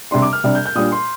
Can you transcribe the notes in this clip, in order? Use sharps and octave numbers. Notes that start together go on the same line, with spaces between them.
C3 G3 D4 C6
D6
F6
C3 G3 D4
G6
G6
A#2 G3 D4 D#6
C6